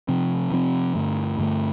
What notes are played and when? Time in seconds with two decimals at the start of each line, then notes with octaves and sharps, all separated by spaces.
0.08 C3 F3 C4
0.52 C3 F3 C4
0.95 G2 D3 A3
1.39 G2 D3 A3